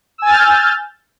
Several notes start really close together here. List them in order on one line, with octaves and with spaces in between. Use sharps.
E6 G#5 A6 F6 G6